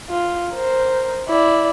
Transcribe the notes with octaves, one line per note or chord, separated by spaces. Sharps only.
F4
A#4 C5
E4 D5